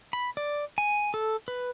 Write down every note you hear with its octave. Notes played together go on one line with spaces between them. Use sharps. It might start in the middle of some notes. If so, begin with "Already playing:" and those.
B5
D5
G#5
A4
B4